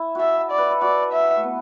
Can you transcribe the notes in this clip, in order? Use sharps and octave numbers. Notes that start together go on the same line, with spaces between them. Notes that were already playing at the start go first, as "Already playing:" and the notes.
Already playing: E4
F#4 A4 E5
D5
B4
A4
F#4 D5
E5
A3
B3